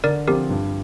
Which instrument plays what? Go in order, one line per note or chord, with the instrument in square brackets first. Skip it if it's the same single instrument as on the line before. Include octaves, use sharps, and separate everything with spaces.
[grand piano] D3 [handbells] A#4 D5
[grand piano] F3 C4 F4 [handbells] G4 A#4
[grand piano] G2